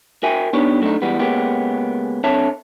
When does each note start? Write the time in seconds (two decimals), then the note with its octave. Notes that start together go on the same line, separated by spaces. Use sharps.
0.23 F#4 A#4 E5 G5 G#5
0.53 D#3 B3 D4 G4 C#5
0.81 F#3 A3 D4 D#4
1.02 E3 G3 G#3 B3
1.19 C#2 G#3 A#3 B3 C#4 G4
2.24 C2 D3 C4 C#5 E5 A5